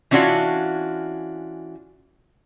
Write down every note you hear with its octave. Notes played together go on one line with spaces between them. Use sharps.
E3 C#4 D4 F4 F#4